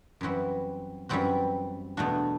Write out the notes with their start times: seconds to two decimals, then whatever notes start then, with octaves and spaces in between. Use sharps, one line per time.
0.21 F#2 E3 G3 C4 F#4
1.09 F#2 E3 G3 C4 F#4
1.97 E2 B2 A3 D4 F#4